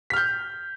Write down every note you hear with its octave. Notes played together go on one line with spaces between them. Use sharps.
F6 G6 B6